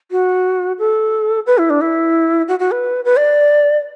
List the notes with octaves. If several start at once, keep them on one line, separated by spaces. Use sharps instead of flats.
F#4
A4
B4
E4
D4
E4
F#4
F#4
B4
B4
D5